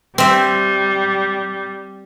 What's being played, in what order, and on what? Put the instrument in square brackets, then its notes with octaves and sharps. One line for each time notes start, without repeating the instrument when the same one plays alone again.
[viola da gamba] G3 [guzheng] C4 E5